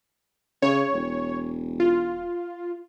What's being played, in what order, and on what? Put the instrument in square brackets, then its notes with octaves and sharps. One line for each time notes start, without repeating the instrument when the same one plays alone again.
[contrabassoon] C#3 [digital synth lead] C#5
[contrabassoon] E1
[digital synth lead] F4